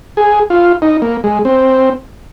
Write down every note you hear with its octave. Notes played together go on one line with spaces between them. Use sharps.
G#4
F4
D#4
A#3
G#3
C4